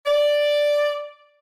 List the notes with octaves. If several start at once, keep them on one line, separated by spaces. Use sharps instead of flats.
D5